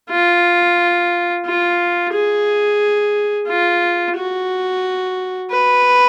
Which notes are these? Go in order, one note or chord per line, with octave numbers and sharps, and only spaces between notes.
F4
F4
G#4
F4
F#4
B4